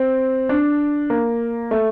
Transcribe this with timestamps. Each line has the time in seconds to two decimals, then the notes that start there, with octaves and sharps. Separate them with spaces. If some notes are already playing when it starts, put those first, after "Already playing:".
Already playing: C4
0.49 D4
1.10 A#3
1.71 A3